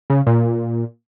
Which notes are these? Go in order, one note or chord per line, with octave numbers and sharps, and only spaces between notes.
C#3
A#2